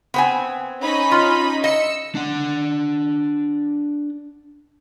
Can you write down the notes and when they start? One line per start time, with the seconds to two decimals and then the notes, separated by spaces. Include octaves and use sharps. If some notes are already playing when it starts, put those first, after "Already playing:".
0.14 B3 C4 G#5
0.81 C#4 D#4 B5
1.12 F4
1.64 D#5 E6 C#7
2.15 D4 F#5